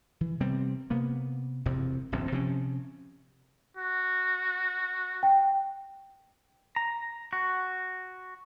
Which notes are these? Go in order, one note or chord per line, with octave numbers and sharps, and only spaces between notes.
E3
C3 G3 B3 C4
C3 A#3 B3
E1 F2 C3 C4
D1 A#1 F#2 C4
C3 F3 C4 C#4
F#4
G5
A#5
F#4